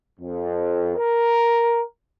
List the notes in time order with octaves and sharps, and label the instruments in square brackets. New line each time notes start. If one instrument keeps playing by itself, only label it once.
[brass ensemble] F2
A#4